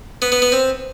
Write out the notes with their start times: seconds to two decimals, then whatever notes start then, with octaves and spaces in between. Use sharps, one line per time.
0.22 B3
0.32 B3
0.42 B3
0.52 C4